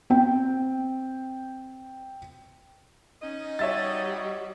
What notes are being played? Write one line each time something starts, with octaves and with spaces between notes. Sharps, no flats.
C4 G5
C#4 D#4 D#5
G3 F#4 C#5 E5 A6